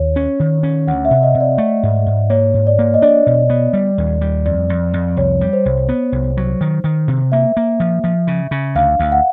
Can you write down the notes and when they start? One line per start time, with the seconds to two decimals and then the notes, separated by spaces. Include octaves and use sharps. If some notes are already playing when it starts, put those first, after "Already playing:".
Already playing: D#2 C#5
0.16 C#4
0.40 D#3
0.63 C#4
0.87 D2 F#5
1.05 E5
1.11 C3
1.23 D#5
1.35 C3
1.41 D5
1.58 A3
1.83 G#2
2.06 G#2
2.30 A#3 C#5
2.54 G#2
2.67 D5
2.79 A#3
2.94 D#5
3.02 D4 D5
3.27 B2
3.50 B3
3.73 G3
3.98 D#2
4.21 G3
4.45 F2 D5
4.69 F2
4.93 F2
5.17 C2 C#5
5.41 G3
5.53 C5
5.65 C2
5.89 B3
6.12 C2
6.37 F#3
6.61 D#3
6.84 D#3
7.08 C3
7.32 A#3 E5
7.57 A#3
7.80 F3
8.04 F3
8.27 C#3
8.51 C#3
8.75 D2 F5
8.99 D2
9.12 F#5